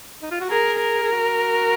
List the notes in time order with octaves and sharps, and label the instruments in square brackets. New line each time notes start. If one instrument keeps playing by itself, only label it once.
[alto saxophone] D#4
F4
F#4
[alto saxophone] G#4 [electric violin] A#4
[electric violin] A#4
[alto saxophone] G#4
F#4